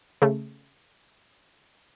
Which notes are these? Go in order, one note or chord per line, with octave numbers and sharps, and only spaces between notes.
C#3 A3